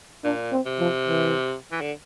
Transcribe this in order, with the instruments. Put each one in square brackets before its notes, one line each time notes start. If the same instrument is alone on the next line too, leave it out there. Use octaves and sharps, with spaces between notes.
[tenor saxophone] A#2 [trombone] D4
[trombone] C4
[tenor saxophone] C3
[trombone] F3
E3
[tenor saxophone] E3
D3